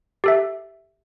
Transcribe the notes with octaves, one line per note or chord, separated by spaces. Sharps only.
G4 A4 E5